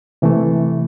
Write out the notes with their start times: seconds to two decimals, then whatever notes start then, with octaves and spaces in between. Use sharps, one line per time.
0.22 C3 E3 A3